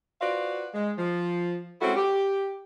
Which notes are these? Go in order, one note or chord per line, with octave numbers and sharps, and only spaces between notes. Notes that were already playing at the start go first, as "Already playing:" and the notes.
F4 F#4 B4 C5 D5 F5
G#3
F3
G#3 C4 C#4 E4 F#4 A4
G4